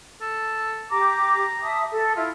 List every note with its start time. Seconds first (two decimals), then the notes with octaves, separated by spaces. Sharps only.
0.21 A4
0.91 G4 A#5 D6
1.63 E5 A5 D#6
1.92 A4
2.16 E4 F4